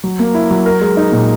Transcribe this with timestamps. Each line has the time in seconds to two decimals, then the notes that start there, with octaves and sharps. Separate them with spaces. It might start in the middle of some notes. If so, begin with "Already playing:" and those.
0.04 F#3
0.19 A#3
0.34 E4
0.51 F#3
0.66 A#4
0.81 G#3
0.97 D#4
1.12 A#2